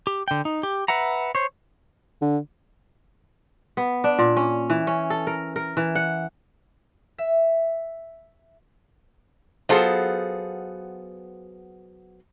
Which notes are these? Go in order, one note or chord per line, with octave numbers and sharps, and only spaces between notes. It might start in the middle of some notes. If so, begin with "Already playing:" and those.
G4
D3 G5
D#4
G4
B4 E5 F#5 A#5
C5 C#5
D3
B3
D4
A#2
C#4
E3
C#4
A4
A#4
A#4
E3
F#5
E5
F#3 B3 F4 G#4 A4 C5